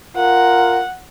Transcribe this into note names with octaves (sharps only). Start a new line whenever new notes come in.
F4 A#4 F#5